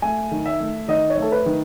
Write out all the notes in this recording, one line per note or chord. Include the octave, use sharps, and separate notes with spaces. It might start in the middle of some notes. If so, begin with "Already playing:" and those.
A3 G#5
D#3
E5
A3
D#3 D#5
C#5
A3 A4
B4
D#3